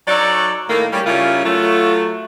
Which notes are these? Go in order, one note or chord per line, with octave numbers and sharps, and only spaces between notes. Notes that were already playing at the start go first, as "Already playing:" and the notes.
F#3 D#4 A4 C#5 D5
A2 D#3 A3 A#3
G3 C#4 G4
C#3 G3 C#4 E4 F4 A#4
F#3 A3 F4